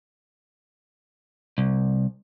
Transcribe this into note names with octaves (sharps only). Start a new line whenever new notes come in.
C2